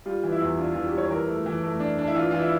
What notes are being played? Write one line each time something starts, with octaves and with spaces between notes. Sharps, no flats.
G3 F4
E3
E4
E2
D4 F4
E3 F4
G4
G3 C#5
E3 A#4
A3
E3
A3
D4
D4
E4
E3 F4
E3 F4
E4